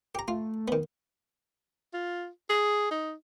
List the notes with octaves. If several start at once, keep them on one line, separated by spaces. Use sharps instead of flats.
G4 A#5
A3 F4
D#3 B3
F4
G#4
D#4